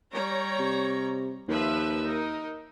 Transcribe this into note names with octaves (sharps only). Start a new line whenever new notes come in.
G3 C#5 A#5
C3
D#2 F3 B4 E5
D#4 A#4